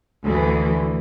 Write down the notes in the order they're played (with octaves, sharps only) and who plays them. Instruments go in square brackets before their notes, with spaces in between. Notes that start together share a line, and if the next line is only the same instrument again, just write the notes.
[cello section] D2 E3